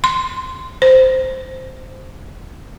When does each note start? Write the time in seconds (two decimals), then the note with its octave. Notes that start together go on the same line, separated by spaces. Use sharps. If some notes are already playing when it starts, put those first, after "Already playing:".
0.04 C6
0.82 C5